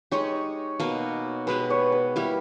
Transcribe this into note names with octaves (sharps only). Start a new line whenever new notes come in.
G#3 D#4 G4 C#5
B2 A#3 D#4 A#4
B2 G#3 B3 G4 B4
C#5
B4
G3 A#3 E4 G4